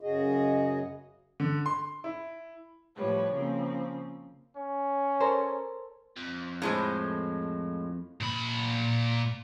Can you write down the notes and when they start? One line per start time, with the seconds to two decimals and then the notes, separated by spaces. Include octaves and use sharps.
0.01 F#2 C#3 F#4 G#4 D#5
1.40 D3
1.66 C6
2.04 E4
2.96 A2 F3 G3 B4 C#5
3.33 C#3 F3 A#3 C4
4.56 C#4
5.20 A4 A#4 C5
6.16 F2
6.62 A2 G#3 C5
8.21 A#2 B5